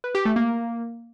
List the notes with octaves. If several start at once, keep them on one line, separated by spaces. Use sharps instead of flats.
B4
G4
A3
A#3